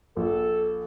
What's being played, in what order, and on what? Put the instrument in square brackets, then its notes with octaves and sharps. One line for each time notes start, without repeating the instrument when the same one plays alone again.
[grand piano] A#1 [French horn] A4